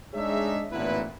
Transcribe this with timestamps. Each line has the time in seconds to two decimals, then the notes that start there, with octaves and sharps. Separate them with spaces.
0.14 G#3 D4 D#4 G#4 C#5 E5
0.71 A1 A#2 D3 B3 E4 B4